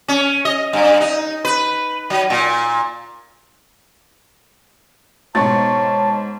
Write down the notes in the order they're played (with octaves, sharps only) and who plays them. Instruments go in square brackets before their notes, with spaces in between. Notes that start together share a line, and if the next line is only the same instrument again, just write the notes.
[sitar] C#4
D#5
G2
D#4
B4
F#3
A#2
[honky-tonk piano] G#2 [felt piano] B2 C#6 A6 [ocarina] C#5 [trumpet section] A5